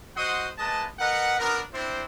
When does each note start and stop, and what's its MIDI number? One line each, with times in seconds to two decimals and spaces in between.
0.16 0.46 66
0.16 0.46 72
0.16 0.46 75
0.16 0.46 78
0.16 0.46 84
0.16 0.46 87
0.58 0.85 56
0.58 0.85 58
0.58 0.85 71
0.58 0.85 75
0.58 0.85 81
0.99 1.34 70
0.99 1.34 71
0.99 1.34 75
0.99 1.34 78
1.39 1.60 59
1.39 1.60 62
1.39 1.60 66
1.39 1.60 70
1.72 2.02 60
1.72 2.02 62
1.72 2.02 64
1.72 2.02 72